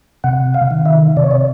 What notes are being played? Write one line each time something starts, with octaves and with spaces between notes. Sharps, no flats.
C3 F#5
F5
D#3
E5
C3 D5
C#5
D5